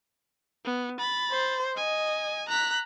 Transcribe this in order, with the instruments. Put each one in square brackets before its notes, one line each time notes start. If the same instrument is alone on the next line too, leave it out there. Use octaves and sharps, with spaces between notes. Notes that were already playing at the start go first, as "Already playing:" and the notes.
[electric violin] B3
B5 A6
[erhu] C5
[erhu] D#5 [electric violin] G#5
[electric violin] A#5 B6 [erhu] F#6